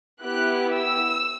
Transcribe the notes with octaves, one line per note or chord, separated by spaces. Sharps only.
B3 E4 G4 F#6
E6